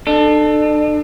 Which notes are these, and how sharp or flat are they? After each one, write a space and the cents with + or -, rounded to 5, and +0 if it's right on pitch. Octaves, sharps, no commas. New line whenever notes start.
D4 +40 A4 +0